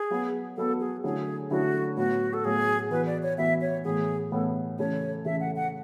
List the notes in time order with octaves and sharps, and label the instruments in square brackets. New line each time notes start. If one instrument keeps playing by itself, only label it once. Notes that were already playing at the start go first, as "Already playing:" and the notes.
Already playing: [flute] G#4
[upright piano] F#3 B3 F#4
[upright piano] F#3 B3 F#4 [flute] A4
[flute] G#4
[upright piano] D3 F#3 A3 E4 [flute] G#4
[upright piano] D3 F#3 A3 E4 [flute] F#4
[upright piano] A2 F#3 B3 [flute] F#4
[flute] A4
[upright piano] A2 F#3 B3 [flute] G#4
[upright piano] E3 B3 F#4 [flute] B4
[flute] D5
C#5
[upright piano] E3 B3 F#4 [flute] E5
[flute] C#5
[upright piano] A2 E3 B3 [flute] G#4
[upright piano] A2 E3 B3 [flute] A4
[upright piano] C#3 E3 A3 [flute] C#5
[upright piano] C#3 E3 A3 [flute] E5
[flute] F#5
F#5